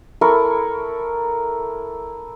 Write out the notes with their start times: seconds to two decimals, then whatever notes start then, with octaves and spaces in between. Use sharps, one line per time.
0.21 E4 A4 A#4 C#6